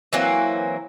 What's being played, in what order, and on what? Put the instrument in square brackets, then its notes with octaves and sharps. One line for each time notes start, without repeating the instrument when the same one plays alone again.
[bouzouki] E3 F#3 A#3 C4